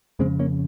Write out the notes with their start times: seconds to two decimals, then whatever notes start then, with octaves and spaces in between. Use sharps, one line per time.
0.19 F2 C#3 G#3 C4
0.39 A#3 C#4